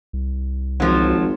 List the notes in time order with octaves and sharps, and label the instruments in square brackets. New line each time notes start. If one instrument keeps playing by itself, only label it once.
[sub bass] C2
[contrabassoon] G#1 [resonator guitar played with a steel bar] F3 F#3